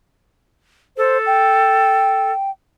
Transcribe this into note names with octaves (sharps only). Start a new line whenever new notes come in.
A4 C5
G5